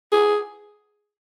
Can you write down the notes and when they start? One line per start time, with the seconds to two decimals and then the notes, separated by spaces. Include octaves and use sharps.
0.12 G#4